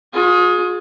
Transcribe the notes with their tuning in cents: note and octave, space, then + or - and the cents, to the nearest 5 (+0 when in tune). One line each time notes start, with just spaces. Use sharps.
F4 +45 G#4 +10